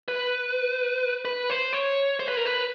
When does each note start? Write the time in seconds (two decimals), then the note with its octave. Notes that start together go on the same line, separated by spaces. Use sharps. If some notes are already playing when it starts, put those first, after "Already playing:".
0.08 B4
1.25 B4
1.50 C5
1.73 C#5
2.20 C5
2.28 B4
2.37 A#4
2.46 B4